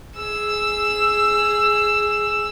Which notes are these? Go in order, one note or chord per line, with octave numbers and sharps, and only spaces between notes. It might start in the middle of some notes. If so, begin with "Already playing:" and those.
G#4 E6